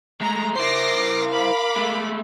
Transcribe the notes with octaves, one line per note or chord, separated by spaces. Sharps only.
G#3 A3 A#5
E4 A#4 C5 D6 A#6 C7
F5 B5 D6
G#3 A3